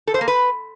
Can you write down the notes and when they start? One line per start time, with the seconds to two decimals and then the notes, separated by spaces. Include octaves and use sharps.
0.07 A4
0.14 C5
0.21 A#3
0.28 B4